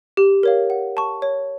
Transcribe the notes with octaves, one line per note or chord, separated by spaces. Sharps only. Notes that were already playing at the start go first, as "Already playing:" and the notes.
G4
A#4 C#5 F5
F#5
A5 C#6
C#5